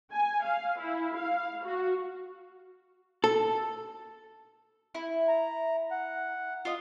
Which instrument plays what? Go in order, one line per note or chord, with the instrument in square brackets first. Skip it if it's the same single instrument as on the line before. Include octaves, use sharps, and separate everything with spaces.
[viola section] G#5
F5
E4
F5
F#4
[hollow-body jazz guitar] A4
[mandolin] E4
[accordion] A#5
F#5
[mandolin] F4 D#5